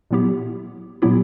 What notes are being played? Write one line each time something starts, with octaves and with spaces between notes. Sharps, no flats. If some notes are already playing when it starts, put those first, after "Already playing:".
A#2 F#3 B3 E4 G4
A#2 F#3 B3 E4 G4